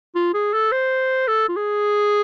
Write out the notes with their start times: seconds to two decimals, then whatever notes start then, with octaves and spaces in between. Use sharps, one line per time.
0.15 F4
0.34 G#4
0.53 A4
0.72 C5
1.28 A4
1.49 F4
1.56 G#4